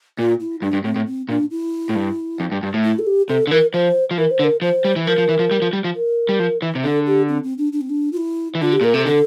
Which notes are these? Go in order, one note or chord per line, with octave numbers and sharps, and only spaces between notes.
A#2 F4
E4
G2 D4
G2
A2 C4
A2
C4
A#2 D4
E4
A2
G2
F2
G2
G2
A2
E4
A4
G4
C3 A4
D3
E3 A#4
F3 C5
F3
E3 A#4
C5
D3
A#4
F3 C5
G3
E3
F3 A#4
F3
E3
F3
G3
F3
G3
F3
A#4
G3
F3
E3
C3
D3 A4
G4
C4
C4
D4
D4
C4
D4
F4
E4
E3
D3 F4
G4
A#2 A#4
C3 A4
D3 A4